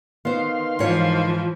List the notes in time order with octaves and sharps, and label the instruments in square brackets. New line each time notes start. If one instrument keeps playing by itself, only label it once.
[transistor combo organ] D#3 F5 C6 [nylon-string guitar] B3 C5
[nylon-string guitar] G#2 C#5 [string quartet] E3 F3